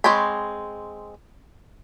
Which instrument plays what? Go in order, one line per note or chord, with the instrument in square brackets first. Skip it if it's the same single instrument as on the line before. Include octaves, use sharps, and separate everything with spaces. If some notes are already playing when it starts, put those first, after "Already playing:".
[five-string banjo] G#3 C4 C#5 G5 B5